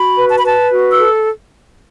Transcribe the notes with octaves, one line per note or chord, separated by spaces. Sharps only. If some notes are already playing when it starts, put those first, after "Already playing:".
Already playing: F#4 B5
B4
A5
B5
B4 A5
F#4
E6
A4